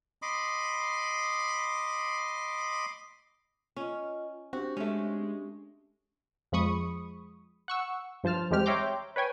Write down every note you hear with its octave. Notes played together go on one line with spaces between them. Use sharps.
D#5 B5 C6 D6
C#4 F4 D#5
C4 D4 F#4 G4
G#3 A3 C#4
F2 F3 G#3 B5 C#6 D#6
F#5 C#6 E6
G2 F3 C5 A5 F6
E2 G3 G#3 C4 G4 F6
C#5 E5 G5 A#5 C6 D6
B4 C#5 G5 G#5